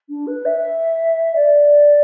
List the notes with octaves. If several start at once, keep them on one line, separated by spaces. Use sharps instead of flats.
D4
B4
E5
D5